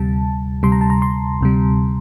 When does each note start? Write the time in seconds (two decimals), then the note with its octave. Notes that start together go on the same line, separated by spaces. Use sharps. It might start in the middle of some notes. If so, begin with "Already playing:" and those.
Already playing: D2 C3 G3 A5
0.63 D2 C3 G3 C6
0.72 A#5
0.81 A5
0.90 A#5
1.02 C6
1.41 D2 C3 G3